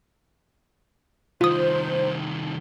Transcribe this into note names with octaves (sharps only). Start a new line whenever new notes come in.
C2 D#3 F4 C5 D#6